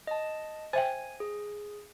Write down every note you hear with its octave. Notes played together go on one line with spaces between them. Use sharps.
D#5 A5
C5 E5 G5 G#5
G#4